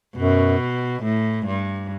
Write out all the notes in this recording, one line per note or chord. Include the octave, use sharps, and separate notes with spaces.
F#2 B2
A2
G2